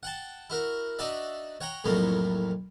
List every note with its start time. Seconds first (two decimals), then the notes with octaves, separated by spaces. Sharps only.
0.03 F#5 G5 A5
0.50 E4 F#4 A#4
0.99 D4 D#4 F#4 D5 E5
1.61 C#5 F#5 G5 A#5
1.84 C2 F2 A2 F#3 A3 A#3